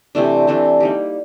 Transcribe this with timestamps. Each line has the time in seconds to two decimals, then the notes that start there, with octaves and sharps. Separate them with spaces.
0.15 C3 E3 A3 D4
0.47 C3 E3 A3 D4
0.80 G3 A#3 D#4 G4